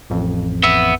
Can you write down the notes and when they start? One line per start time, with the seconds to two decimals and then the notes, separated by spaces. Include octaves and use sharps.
0.10 A1 F2
0.63 B3 E5